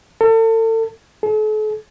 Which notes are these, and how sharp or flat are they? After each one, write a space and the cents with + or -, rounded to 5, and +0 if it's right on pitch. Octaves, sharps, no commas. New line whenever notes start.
A4 +35
A4 -45